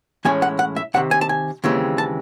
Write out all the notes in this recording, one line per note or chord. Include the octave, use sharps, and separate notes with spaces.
A2 E3 G#3 C#4 G#5
F#5
F#5
E5
C2 C3 D#3 F#5
G#5
A5
G#5
D#2 C#3 E3 G#3 C4
A5